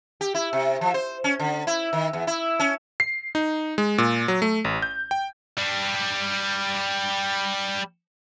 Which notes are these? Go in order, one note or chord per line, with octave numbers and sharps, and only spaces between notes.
G4
E4
C3
F3
C5
C#4
D3
E4
D#3
E2
E4
C#4
C7
D#4
G#3
A#2
F#3
A3
A1
G6
G5
G3 D4